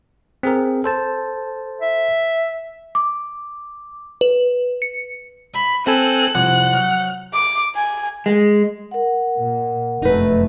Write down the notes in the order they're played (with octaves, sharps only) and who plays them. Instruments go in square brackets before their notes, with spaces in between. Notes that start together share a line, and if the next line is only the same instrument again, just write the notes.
[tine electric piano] C4 G#4 A#4
A4 C5 A5
[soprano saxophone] E5
[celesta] D6
[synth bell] B4
C#7
[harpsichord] E5 [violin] B5
[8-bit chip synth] C4 A4 G#5 [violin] F#6
[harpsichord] C2 F2 D5 [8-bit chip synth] F#5
[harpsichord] F#3
[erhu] D6
G#5
[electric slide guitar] G#3
[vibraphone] A#4 F#5
[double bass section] A#2
[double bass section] F1 F#2 A3 [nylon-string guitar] D#4 B4